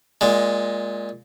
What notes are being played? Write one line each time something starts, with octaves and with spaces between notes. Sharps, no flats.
A#2 G#3